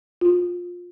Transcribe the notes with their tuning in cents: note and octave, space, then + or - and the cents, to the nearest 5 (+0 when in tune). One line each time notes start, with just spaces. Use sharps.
F4 +20